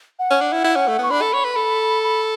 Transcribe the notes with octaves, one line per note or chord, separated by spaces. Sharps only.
F#5
C#4
D4
E4
E4
C#4
A3
B3 C#6
D4 B5
A4
C#5
B4
A4
B5